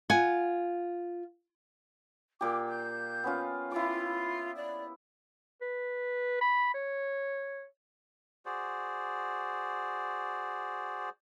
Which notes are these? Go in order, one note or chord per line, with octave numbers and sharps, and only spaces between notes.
F4 F#5 G#5
A#2 G4 D6
G6
B3 C#4 F4
E4 F4 D6
D5
B4
B5
C#5
F#4 G#4 C5 D5